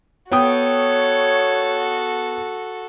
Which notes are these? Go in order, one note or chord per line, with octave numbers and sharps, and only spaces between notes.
B3 F#4 A4 C#5 G5 D#6